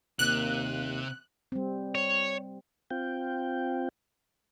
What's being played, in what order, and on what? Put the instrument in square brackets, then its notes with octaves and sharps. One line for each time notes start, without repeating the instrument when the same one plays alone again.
[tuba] D#2 [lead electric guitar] C3 [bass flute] A#3 [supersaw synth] F#6
[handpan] G3 C4
[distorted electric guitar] C#5
[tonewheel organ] C4 F4 G5